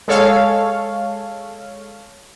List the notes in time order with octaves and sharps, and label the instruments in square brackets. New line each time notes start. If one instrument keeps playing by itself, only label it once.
[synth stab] G#3 A4 C#5 F5